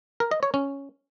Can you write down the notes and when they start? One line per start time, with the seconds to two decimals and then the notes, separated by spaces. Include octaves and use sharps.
0.20 A#4
0.31 D#5
0.43 C#5
0.54 C#4